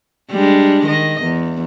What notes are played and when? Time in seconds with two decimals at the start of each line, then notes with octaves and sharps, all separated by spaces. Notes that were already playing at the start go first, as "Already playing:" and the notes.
0.32 G3 G#3 D4
0.87 D#3 D#5
1.24 E2